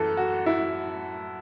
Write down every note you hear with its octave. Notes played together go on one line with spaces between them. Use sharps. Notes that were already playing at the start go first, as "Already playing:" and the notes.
Already playing: F#2 E3 A4
F#4
E4